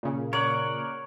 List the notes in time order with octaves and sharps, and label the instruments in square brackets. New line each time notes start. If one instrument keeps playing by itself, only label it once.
[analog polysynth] A#2 C#3
[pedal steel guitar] A#4 D5 F#5 [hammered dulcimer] C#5